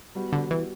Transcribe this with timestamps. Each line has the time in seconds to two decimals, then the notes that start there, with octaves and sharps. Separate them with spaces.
0.15 G3 B3 F#4
0.33 D3
0.51 E3